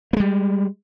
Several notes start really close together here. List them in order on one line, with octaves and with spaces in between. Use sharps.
A#3 G#3 G3